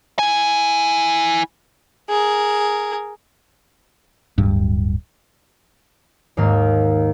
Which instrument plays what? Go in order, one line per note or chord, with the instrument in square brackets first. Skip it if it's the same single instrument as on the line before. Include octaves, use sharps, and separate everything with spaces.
[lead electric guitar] E4 G#5
[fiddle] G#4 A#4
[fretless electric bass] D1 G2
[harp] D#2 G#2 A#3 A#4